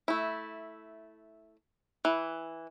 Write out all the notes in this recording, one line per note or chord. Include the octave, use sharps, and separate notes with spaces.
A3 E4
E3